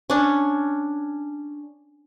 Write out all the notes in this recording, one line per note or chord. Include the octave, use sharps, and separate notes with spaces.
C#4 D4